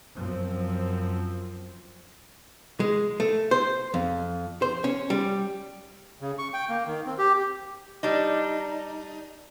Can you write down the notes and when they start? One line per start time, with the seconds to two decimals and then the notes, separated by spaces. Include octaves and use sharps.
0.14 F#2 F3 C4
2.80 G#3
3.20 A3
3.51 C5
3.94 F2
4.62 C5
4.84 C#4
5.10 G3
6.21 C#3
6.38 C#6
6.53 G5
6.69 A#3
6.87 D#3
7.06 C4
7.19 G4
8.03 G3 D4 D#4